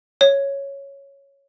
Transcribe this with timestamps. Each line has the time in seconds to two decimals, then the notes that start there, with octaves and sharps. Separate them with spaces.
0.21 C#5